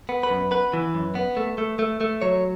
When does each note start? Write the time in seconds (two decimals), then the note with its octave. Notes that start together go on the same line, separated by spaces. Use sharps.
0.09 B3
0.23 B4
0.30 F#2
0.51 B3 B4
0.73 E3
0.94 F#2
1.15 B3
1.37 A3
1.58 A3
1.79 A3
2.01 A3
2.22 F#3 C#5